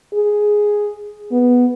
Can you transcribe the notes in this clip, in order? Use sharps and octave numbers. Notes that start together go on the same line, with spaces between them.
G#4
B3